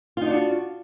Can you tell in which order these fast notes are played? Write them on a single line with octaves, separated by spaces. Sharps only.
F4 D#4 D4 F#4